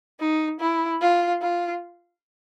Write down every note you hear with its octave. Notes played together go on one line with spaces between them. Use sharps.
D#4
E4
F4
F4